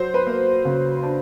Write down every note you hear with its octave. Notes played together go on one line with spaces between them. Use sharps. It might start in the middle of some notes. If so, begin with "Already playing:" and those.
Already playing: F#3 C5
B4
A#3
C#3
D4